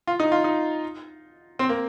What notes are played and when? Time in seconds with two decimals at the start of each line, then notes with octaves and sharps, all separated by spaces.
0.07 F4
0.20 D#4
0.32 F4
0.44 D#4
1.59 C4
1.69 A#3